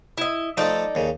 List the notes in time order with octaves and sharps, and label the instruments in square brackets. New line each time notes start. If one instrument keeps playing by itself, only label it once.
[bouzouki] E4 D#5
[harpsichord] F3 A3 [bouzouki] D#4 A4 D5
[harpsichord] D#2 C#3